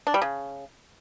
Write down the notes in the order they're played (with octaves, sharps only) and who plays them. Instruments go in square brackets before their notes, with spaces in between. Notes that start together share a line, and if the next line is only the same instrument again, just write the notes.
[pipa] D4
G3
C#3